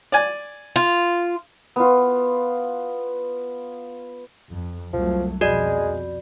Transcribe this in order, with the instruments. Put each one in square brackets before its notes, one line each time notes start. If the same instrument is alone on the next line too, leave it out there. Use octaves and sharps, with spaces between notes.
[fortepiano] D5 G#5
[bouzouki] F4
[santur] B3 F4
[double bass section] F2
[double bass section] C2 F#3 A3 [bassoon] F3
[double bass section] F2 B2 [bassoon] G#3 [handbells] F#4 D5